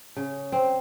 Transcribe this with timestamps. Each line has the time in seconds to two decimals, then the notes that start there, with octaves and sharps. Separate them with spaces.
0.17 C#3
0.52 C4